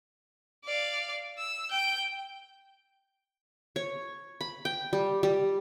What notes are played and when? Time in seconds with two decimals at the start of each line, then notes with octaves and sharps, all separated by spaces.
0.64 D5 F5
1.38 E6
1.70 G5 G6
3.76 C#5
4.41 B5
4.65 G5
4.93 G3
5.23 G3